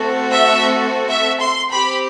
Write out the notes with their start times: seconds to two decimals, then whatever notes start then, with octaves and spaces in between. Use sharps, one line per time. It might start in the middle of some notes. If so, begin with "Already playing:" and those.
Already playing: A3 C4 F#4 A4
0.32 E5
1.10 E5
1.40 C6
1.71 C4 G4 B5